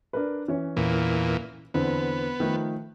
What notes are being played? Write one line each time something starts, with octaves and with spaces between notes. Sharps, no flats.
D4 A#4 B4
E3 C#4
E2 A#2
E2 D3 B3 C4
D#3 F3 A3